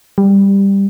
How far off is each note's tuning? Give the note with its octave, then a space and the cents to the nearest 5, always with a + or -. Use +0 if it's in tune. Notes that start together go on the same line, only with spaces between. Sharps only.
G3 +10